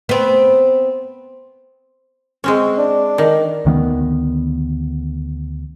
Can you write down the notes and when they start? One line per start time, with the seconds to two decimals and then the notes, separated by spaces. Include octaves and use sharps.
0.09 B3 C4
2.44 G#3 C4 C#4
2.78 D4
3.18 D#3
3.65 D2 D#3 A#3 B3